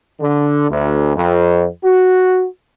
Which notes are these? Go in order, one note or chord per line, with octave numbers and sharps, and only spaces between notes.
D3
D2
F2
F#4